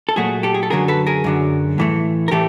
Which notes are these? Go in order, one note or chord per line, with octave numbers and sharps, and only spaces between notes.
A4
A#2 F#3 A3 F#4 G#4
G4 A4
G#4
A4
F#2 D3 F#3 G#4 A#4
A4 B4
G#4 A#4
F#2 D3 F#3
A2 E3 A3
A#4
A2 E3 A3 G4 A4